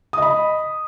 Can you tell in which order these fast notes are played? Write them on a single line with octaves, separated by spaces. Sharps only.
D#6 D#5 B5